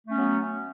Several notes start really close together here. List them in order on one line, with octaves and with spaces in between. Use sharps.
A3 C#4 B3 F#3